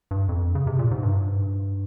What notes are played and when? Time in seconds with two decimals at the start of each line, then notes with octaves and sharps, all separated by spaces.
0.11 G2
0.29 F2
0.55 C#3
0.67 C3
0.79 A#2
0.91 G#2
1.03 G2